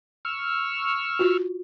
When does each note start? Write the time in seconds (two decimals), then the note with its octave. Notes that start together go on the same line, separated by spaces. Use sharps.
0.25 C#6 E6 F6
1.19 F4 F#4